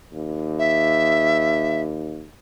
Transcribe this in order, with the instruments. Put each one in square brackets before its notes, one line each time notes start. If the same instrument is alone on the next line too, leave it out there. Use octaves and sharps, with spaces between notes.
[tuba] D#2
[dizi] E5